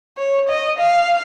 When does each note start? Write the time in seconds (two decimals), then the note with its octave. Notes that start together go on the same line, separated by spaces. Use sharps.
0.18 C#5
0.48 D#5
0.78 F5